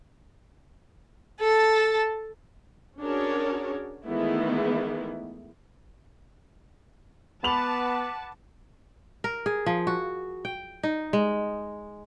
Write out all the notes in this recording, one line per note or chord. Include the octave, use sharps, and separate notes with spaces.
A4 A5
C#4 D4 F#4 G#4 A#4 C#5
D#3 E3 G#3 A3 B3 E4
B3 B4 F#5 A5 B5 D6 F7 F#7
A#4
G#4
F3
F#4
G5
D#4
G#3